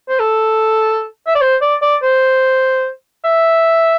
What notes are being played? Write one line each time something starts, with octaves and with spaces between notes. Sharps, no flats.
C5
A4
E5
D5
C5
D5
D5
C5
E5